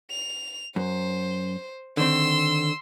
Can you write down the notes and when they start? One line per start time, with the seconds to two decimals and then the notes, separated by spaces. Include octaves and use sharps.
0.11 F7
0.76 F#2 C5
1.97 D3 D#3 C4 C6 E6